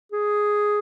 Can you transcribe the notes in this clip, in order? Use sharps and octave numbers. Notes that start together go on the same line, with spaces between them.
G#4